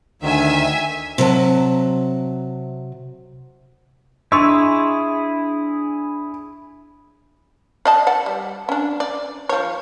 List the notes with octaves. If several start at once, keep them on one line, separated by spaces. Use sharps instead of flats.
D2 D#3 E5 G#5
C3 F#3 E5 A5
D4 E4 G#4 D#5 C6 C#6 E6
D5 D#5 A5
D5 F#5
G3
C#4 D4
D5
F3 C#5